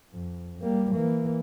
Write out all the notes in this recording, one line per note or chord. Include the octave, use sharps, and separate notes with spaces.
F2
G3 A#3
E3 A#3